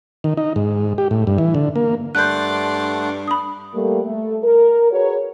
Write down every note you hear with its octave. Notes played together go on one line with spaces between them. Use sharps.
D#3
D#4
G#2
G4
A2
G2
E3
D3
A#3
G2 A3 D5 F#5 C6 F#6 G6
B5 D#6
G3 A3 A#3
A3
A#4
F#4 G#4 A#4 B4 C#5